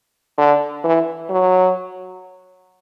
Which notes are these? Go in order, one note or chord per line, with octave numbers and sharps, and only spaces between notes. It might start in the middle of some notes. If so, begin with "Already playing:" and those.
D3
E3
F#3